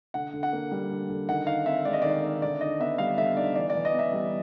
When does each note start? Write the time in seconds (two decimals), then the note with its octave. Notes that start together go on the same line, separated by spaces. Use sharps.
0.14 D3 F#5
0.33 D3
0.43 F#5
0.53 A#3
0.71 G3
0.90 D3
1.09 D3
1.29 D#3 F#5
1.47 D#4 F5
1.66 C4 E5
1.85 G#3 D5
1.93 D#5
2.02 D#3 D5
2.23 D#4
2.42 D3 D5
2.61 D#4 D#5
2.80 B3 E5
2.98 G3 F5
3.17 D3 E5
3.37 D#4 D5
3.55 E3 D5
3.70 D5
3.75 E3
3.85 D#5
3.94 B3 E5
4.13 G3